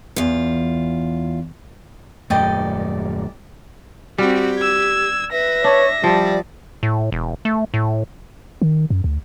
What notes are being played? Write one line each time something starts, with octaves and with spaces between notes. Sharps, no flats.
E2 F4
D#1 F#2 A3 D5 D#5 G5
G3 C4 F#4 G4
E6 G#6
B4 E5 A#6
D4 C#5
F3 G3 D5
A2
E1
A3
A2
D#3
F#2
D2